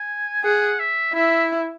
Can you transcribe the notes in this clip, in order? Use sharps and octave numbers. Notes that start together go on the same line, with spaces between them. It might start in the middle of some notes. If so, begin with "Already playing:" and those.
Already playing: G#5
G#4 F#5
E5
E4 E5